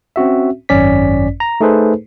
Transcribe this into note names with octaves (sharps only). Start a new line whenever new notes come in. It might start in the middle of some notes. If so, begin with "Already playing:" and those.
C4 C#4 F#4 E5
G#1 F#2 C#4 D5 B6
A#5
A3 D#4 G#4 A4 B4 C5